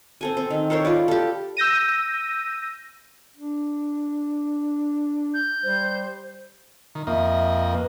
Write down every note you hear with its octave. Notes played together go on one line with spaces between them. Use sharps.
C4 A4 G#5
C4
D#3
A4 A#4 C5 C#5
F4 B4 D5
G4 A4
E6 G6 A#6 D#7
D4
G6
G3 C5
D#3
F2 A#3 D#5 E5
B4